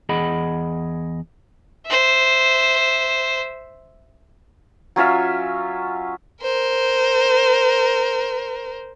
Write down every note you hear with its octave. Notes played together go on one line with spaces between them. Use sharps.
E2 G#4 D#5 F#5 B5
C5 E5
F#3 C#4 F4 E5
A#4 C5